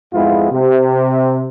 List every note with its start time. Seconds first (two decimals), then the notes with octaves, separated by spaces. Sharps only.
0.13 F2 G#2 G#3 B3 E4 F4
0.51 C3